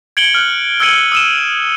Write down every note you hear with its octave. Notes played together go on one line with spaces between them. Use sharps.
G#6 C#7 D7 F#7 G7
F6 F#6
E6 F6 G#6 C#7 D#7 F#7
D#6 E6 D#7 E7